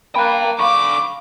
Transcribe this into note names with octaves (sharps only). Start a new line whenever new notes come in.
A#3 G5 A5 B5 F#6
D3 F5 B5 C#6 D6